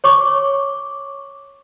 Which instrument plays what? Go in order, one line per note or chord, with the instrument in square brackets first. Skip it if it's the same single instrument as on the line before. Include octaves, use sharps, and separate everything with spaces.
[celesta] C#5 C#6 D6